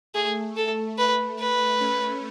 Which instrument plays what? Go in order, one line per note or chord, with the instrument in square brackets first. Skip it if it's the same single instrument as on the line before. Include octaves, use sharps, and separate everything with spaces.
[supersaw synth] A3 [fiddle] G#4
[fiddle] A4
B4
B4
[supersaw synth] A3 C#4